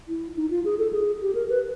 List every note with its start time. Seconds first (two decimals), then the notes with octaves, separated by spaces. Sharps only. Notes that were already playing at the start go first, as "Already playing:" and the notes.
0.08 E4
0.37 D#4
0.51 F4
0.65 G#4
0.78 A4
0.93 G#4
1.22 G4
1.35 A#4
1.50 B4